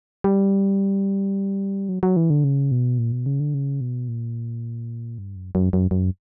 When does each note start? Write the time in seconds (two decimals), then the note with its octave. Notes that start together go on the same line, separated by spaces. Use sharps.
0.24 G3
1.89 F#3
2.03 F#3
2.17 E3
2.30 D3
2.44 C#3
2.72 B2
2.98 A#2
3.12 B2
3.26 C#3
3.40 D3
3.54 C#3
3.81 B2
4.08 A#2
5.18 G2
5.36 F#2
5.55 F#2
5.73 F#2
5.91 F#2